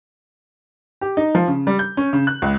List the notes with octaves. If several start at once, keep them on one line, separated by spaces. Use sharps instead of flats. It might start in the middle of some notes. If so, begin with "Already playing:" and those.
G4
D#4
F3
C#3
G3
G6
C#4
C#3
F#6
C#2